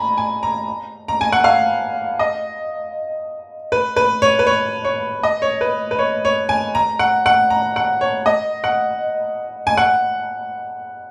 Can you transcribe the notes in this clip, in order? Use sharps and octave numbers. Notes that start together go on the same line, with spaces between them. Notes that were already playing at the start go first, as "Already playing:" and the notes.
Already playing: G#5 A#5 B5
G#5
A#5
A#5
G#5
F#5
F5
D#5
B4
B4
C#5
B4
C#5
C#5
D#5
C#5
B4
B4
C#5
C#5
G#5
A#5
F#5
F#5
A#5
F#5
C#5
D#5
F#5
G#5
F#5